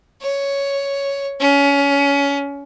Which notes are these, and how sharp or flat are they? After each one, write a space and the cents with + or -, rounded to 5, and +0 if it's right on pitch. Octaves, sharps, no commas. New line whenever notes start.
C#5 +5
C#4 +25